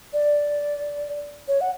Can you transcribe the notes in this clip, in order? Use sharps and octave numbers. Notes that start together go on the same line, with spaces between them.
D5
C#5
F#5